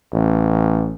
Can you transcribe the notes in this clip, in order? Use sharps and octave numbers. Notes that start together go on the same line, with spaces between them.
A1